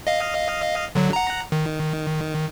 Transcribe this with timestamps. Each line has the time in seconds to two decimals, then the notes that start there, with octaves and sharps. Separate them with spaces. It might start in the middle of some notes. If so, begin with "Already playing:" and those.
0.07 D#5 F5
0.95 D3 F#3
1.13 F#5 A#5
1.52 D#3